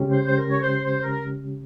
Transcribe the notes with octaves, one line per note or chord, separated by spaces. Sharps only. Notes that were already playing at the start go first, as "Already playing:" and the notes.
Already playing: C#3 G#3 C#4 G4
C5
C5
A#4
C#5
C5
C5
A#4